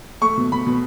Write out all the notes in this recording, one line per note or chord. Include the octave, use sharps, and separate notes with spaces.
A3 C#6
B2
B2 B5
B2